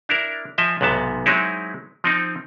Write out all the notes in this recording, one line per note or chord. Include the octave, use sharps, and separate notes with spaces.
D4 E4 A#4
F3 D#5 E5 G#5
B1 G#2 C3 B3 A5
F#3 G#3 C4 D#4 E4
F3 C4 D#4